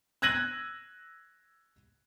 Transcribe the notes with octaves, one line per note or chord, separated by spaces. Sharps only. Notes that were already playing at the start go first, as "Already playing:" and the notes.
E6 F#6 G#6 A#6 D#7 F#7